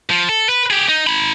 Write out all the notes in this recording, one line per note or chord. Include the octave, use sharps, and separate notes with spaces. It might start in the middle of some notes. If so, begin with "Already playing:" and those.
F3
A4
B4
G4 G#4
D#4
D#4 B5